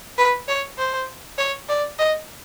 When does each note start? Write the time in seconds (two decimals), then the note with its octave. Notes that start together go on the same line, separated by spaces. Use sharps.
0.18 B4
0.48 C#5
0.78 C5
1.38 C#5
1.68 D5
1.99 D#5